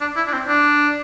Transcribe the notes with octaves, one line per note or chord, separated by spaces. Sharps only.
D4
E4
D4
C4
D4